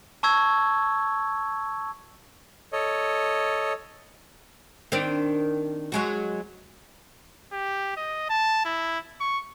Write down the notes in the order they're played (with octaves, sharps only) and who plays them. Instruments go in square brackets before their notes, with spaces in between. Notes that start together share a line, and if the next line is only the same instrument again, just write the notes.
[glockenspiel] A5 C#6 E6 G#6
[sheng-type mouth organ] A4 C#5 D#5
[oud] D#3 C4 D4
F#3 G#3 F#4
[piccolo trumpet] G4
D#5
A5
E4
C#6